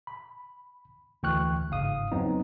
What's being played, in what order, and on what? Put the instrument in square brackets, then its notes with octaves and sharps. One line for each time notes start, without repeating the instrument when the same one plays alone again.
[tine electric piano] B5
D2 E3 G5 C#6 F6 F#6
G1 G#2 C#3 F5 D#6
F2 F#3 B3 C4 D#4